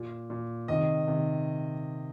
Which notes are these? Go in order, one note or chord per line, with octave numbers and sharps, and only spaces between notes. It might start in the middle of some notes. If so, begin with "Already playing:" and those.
Already playing: A#2
A#2
C3 D#3 D#5
C3 D#3